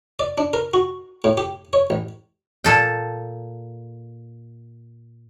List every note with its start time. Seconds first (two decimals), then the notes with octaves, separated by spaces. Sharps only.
0.19 D5
0.38 D4
0.53 A#4
0.74 F#4
1.24 A2
1.37 G4
1.73 C#5
1.90 A1
2.64 A#2 A4 G5